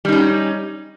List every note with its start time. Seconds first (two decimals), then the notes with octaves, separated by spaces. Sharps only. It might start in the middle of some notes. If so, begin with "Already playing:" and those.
0.05 G3
0.09 D#4
0.12 C#4